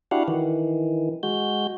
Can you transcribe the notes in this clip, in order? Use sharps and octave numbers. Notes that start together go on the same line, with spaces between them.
D4 E4 F#4 G4 F5 F#5
D#3 E3
G#3 F#4 G6